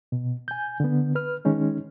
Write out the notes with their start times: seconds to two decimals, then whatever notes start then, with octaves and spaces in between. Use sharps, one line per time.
0.12 B2
0.48 G#5 G6
0.80 D3 B3
1.15 B4 F6
1.45 D#3 G#3 C#4 D#4